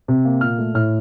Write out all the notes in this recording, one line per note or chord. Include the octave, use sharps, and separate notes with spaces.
C3
A#3
A#2 F6
A3
A2 F6